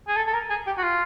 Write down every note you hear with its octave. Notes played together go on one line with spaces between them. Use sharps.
G#4
A4
A4
A#4
G#4
G4
F#4
F4